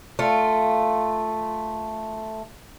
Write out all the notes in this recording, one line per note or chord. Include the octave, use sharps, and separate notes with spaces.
A3 F4